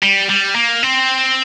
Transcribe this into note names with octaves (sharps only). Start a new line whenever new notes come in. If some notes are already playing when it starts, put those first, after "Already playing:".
G3
G3
A#3
C4